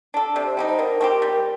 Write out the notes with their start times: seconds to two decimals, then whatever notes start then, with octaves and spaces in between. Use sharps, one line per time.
0.14 D4 A4
0.35 C3 D5
0.46 C5
0.57 G3 C4 D#4
0.68 C5
0.79 D3 A#4
1.01 A3 C4 G4
1.22 G3